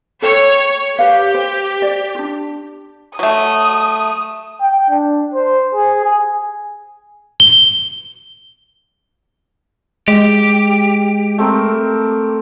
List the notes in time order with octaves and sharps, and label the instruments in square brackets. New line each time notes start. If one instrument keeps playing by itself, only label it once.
[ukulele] A4 G5 [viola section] C#5
[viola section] G4 [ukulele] B4 F5
[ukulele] C5
D5
D4 F4
[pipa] F#3 A3 [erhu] D#6
[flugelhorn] G5
D4
C5
G#4
G#5
[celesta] G7
[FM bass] G#3 [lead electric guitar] G4
[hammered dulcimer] A3 C4 A#4